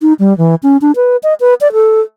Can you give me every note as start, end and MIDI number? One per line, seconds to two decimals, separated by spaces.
0.02 0.13 63
0.19 0.36 55
0.38 0.55 52
0.63 0.77 61
0.82 0.92 62
0.96 1.17 71
1.23 1.34 75
1.40 1.54 71
1.61 1.72 74
1.73 2.01 69